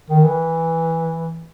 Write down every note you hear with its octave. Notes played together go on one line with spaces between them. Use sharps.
D#3
E3